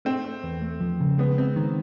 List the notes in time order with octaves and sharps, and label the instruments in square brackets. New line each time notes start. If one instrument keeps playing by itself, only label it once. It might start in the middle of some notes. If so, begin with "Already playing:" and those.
[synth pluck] A3 [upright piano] C4
[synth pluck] A3
E2
A3
F3
C#3
[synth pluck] G#3 [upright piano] B3
[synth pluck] C4
D#3